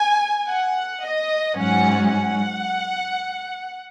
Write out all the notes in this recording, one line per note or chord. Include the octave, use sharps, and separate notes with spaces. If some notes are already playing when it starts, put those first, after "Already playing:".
Already playing: G#5
F#5
D#5
G#2 F#3 C#4 F#5
F#5